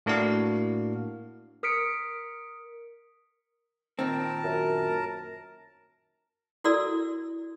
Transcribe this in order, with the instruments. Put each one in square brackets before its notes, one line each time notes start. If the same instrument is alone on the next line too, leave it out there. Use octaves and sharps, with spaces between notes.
[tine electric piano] A2 A#3 D4 F#4 F5
[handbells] A#4 D#6 F6 B6 C#7 D7
[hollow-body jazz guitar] A#2 D#3 C4 [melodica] A#4 A5
[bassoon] F#2
[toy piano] E4 F#4 A4 A#4 D5 E6